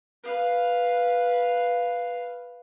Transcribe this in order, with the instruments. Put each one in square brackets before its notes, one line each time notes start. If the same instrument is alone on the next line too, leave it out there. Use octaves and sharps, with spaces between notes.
[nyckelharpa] B4 F5